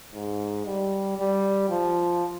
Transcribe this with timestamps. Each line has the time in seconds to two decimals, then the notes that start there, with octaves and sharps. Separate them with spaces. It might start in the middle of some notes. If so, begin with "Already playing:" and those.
0.14 G#2
0.65 G3
1.18 G3
1.69 F3